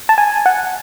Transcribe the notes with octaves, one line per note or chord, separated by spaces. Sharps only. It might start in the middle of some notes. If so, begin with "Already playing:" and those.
A5
G#5
F#5